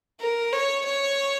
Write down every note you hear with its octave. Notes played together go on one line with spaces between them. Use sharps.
A#4
C#5
C#5